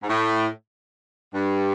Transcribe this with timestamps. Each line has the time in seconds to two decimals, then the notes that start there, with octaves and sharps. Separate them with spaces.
0.03 G#2
0.09 A2
1.34 G2